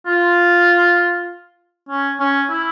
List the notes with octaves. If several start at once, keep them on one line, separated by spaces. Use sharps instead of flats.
F4
C#4
C#4
E4